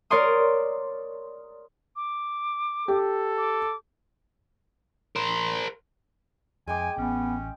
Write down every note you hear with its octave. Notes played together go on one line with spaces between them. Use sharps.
A#4 C#5 D5 C6 D#6
D6
G4 A4
D6
A#4 C5
F2 G#3 G5 G#5 D6
A1 B3 C#4